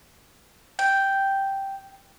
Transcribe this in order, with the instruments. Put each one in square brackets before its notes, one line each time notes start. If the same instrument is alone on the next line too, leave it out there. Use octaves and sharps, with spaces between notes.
[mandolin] G5